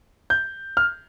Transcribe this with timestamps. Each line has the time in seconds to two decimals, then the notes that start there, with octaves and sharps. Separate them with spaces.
0.30 G6
0.77 F6